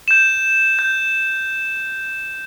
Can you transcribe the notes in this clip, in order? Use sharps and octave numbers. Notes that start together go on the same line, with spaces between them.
G6 E7
G6